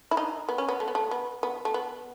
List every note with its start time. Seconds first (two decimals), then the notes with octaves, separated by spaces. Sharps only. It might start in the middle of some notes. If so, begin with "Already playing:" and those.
0.11 E4
0.17 D#4
0.49 B3
0.58 C#4
0.69 B3
0.80 A3
0.88 B3
0.95 A3
1.11 B3
1.43 B3
1.65 A3
1.74 B3